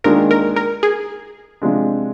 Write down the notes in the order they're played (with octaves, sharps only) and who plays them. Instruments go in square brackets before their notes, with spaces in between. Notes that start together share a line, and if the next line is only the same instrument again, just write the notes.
[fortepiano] D#2 D#3 G#3 D4 F4 [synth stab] A#4
[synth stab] A#4
A#4
G#4
[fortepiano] C3 F3 G#3 D4